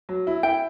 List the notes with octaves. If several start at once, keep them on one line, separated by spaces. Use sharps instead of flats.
F#3
E4
E4 G5